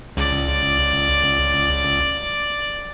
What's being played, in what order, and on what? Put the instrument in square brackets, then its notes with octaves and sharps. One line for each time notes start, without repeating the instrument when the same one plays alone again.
[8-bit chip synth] C#2 [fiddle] D5